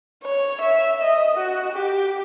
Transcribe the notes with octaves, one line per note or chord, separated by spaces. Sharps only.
C#5
E5
D#5
F#4
G4